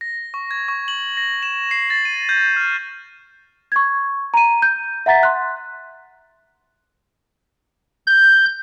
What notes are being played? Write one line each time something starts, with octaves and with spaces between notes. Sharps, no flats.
A#6
C#6
G#6
C#6
F#7
A#6
E7
C7
A6
D#7
G6
F6
C#6 G#6
A#5 D#7
G6 D#7
E5 F#5 A#5 A6 B6
C6 F#6
G6